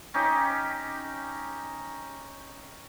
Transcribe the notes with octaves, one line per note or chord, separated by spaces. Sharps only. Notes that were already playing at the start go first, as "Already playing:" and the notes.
C#4 D#4 G4